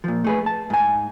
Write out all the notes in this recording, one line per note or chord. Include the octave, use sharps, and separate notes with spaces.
A#2 F3
A3 G#4 B4
A5
G#2 G#5